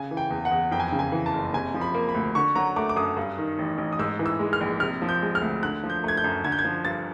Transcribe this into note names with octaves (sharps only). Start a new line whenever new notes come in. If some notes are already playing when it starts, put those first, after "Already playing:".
Already playing: C#3 G#5
E3
G5
E2
F#5
E2
F2 G5
G#5
G5
C#3
G#5
E3
A5
F#1
C3 G#5
F3
B5
A#3
B5
D2
D3 C#6
F#3 A#5
A3 D6
D6
F#2 D#6
G2
D#3
A1
A1
D#6
G#2 E6
E3
E6
G#3
F6
A#1
C3 F6
F3
G6
G#3
F6
D2
D3 F#6
F3
G6
A3 G#6
G6
F#2
D3 G#6
G6
G#6
F3
G2 A6